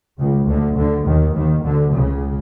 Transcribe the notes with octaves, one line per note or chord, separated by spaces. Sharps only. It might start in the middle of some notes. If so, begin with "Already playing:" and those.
C#2 C#3
D2 D3
D2 D3
D#2 D#3
D#2 D#3
D2 D3
C#2 C#3